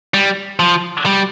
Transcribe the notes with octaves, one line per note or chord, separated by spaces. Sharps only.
G3
F3
G3